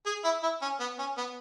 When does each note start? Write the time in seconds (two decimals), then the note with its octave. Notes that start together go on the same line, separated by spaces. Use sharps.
0.06 G#4
0.24 E4
0.43 E4
0.62 C#4
0.80 B3
0.99 C#4
1.18 B3